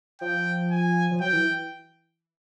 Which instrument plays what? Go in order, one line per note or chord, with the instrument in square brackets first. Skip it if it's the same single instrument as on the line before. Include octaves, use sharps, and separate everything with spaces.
[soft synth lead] F3 [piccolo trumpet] G5
[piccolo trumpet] G#5
[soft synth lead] F3
[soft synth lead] F#3 [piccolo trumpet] G5
[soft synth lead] E3